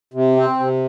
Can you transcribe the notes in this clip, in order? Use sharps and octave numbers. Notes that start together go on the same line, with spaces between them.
C3
C4
C3